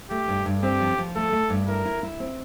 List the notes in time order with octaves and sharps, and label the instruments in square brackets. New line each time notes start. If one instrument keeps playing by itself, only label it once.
[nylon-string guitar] A3 [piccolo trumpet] G4
[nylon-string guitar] G2
G2
[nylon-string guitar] C4 [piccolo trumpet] G4
[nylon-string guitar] F3
F3
[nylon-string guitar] A3 [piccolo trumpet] A4
[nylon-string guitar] A3
G2
[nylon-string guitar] E4 [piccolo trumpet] A#4
[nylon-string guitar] E4
E4
C4